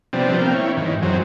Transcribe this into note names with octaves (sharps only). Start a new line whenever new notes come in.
C3 F3 G3 B3 C4 D4
A#3 F5 G5
E4 C#5
G#2 D#3 E3
F#2 F#3 G#3 C4